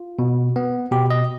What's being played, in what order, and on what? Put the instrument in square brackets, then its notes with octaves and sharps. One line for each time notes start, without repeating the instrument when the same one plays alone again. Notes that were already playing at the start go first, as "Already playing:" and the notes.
Already playing: [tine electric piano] F4
B2
B3
B2 G4
D#5